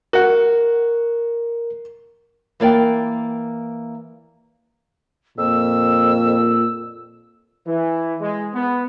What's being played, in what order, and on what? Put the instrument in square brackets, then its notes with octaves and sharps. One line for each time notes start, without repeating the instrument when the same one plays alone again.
[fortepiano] F#4 F#5 [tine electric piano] A#4
[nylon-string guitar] E3 A#3 D5 G5
[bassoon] F2 [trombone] A#2 [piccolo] E6
[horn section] E3
G#3
B3